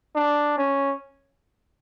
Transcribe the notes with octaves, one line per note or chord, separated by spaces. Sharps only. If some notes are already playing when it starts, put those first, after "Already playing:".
D4
C#4